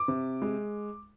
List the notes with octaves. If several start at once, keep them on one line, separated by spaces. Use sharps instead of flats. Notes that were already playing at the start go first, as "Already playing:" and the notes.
Already playing: D6
C3
G#3